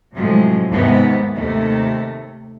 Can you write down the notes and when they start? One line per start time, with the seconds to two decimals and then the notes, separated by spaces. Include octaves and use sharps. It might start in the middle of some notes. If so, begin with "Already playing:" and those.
0.14 A2 C3 F3 F#3 G#3
0.69 D#2 G#2 C3 B3
1.33 D#2 C3 A3